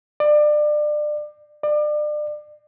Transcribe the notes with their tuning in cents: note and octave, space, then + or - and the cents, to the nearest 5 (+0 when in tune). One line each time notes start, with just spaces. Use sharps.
D5 +30
D5 +35